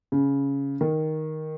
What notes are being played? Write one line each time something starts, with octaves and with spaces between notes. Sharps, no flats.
C#3
D#3